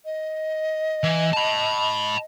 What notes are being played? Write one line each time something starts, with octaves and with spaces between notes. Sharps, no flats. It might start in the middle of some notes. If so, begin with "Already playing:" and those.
D#5
E3
A5 B5